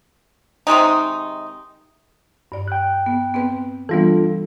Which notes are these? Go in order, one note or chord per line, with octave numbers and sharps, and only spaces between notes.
C3 D#3 G#3 D#4
G2 D5
G5 F#6
B3
B3 C4 B4
E3 G3 B3 D4 F4 A4